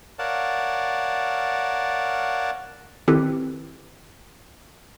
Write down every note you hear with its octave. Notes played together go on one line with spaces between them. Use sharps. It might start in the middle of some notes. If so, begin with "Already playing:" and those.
A#4 C#5 D5 F5 F#5 A5
D#3 C4 E4 G4 A4 B4